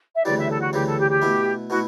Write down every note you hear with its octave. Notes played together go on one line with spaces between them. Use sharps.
E5
D2 C#3 E3 G3 D5
E5
A4
F#4
D2 C#3 E3 G3 G4
A4
G4
G4
B2 A3 E4
B2 A3 E4 F#4